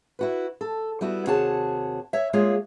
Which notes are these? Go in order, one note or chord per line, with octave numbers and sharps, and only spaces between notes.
E4 F#4 B4
A4
G3 B3 E4 F#4
D#2 C3 F#4 G#4 C#5 A5
C#5 E5
G#3 A#3 F4 G#4 C#5